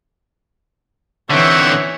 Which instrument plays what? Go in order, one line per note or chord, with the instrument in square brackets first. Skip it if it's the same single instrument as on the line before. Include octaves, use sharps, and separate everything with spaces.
[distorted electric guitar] D3 C4 [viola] E3 C#5 [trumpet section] D#4 E5 F#5